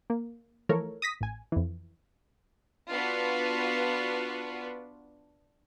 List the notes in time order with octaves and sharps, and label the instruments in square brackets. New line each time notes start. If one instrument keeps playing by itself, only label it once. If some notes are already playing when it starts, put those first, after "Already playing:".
[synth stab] A#3
E3 F3 A3 A4 A#4 C#5
D#6 A#6 B6
A1 G#5
F2 E3
[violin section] B3 D4 F4 F#4 B4